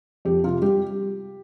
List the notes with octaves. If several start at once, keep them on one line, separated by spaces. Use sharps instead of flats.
F2 G4
C3 F4
G3 G4